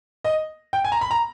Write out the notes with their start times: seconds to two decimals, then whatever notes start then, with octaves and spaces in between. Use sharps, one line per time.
0.24 D#5
0.73 G5
0.85 G#5
0.92 A#5
1.01 B5
1.11 A#5